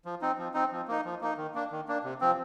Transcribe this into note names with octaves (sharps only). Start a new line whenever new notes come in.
F3
C4 D#4
F3
C4 D#4
F3
A#3 D#4
F3
A#3 D#4
D#3
A#3 D4
D#3
A#3 D4
C3
F3 C4